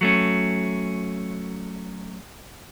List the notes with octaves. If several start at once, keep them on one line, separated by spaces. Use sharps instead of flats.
F#3 A3 C#4